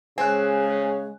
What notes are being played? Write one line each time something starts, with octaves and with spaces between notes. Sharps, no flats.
C#3 G#3 C4 G#5 F#6